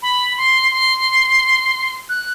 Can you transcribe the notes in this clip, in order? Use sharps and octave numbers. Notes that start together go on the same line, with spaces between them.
B5
C6
C6
F#6